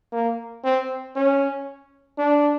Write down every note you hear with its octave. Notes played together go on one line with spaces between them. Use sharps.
A#3
C4
C#4
D4